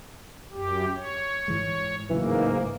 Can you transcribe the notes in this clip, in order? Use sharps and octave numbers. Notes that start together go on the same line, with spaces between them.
F#2 G4
C#5
G#2 E3 G#3
A1 G#2 C#3 E3 F#3 A#3